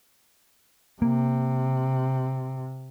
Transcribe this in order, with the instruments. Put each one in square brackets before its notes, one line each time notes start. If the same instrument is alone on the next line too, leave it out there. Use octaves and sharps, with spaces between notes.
[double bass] C3 [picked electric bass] A#3